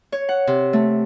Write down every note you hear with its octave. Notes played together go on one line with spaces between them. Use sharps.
C#5
F#5
C3
A3